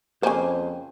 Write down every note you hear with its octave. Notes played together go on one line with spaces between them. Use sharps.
F2 C#3 A#3 C5 G#5